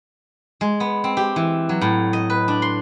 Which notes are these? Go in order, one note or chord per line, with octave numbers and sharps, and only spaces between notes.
G#3
B3
C4
G4
E3
F#3
A2
D#5
B4
D4
C6